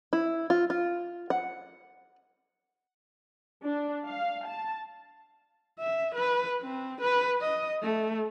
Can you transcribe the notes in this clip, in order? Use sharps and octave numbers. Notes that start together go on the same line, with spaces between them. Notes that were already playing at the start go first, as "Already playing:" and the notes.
E4
F4
F4
F#5
D4
F5
A5
E5
B4
C4
B4
D#5
A3